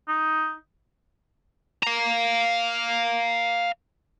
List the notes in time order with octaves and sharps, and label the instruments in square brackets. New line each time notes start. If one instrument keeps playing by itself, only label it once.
[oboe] D#4
[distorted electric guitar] F5 A#5